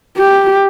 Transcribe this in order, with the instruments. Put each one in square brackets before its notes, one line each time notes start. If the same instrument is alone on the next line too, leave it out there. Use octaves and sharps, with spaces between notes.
[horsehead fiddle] G4